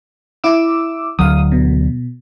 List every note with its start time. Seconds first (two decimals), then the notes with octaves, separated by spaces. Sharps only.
0.44 E4 D6 E6
1.19 D2 F#3 F5 D#6
1.52 B2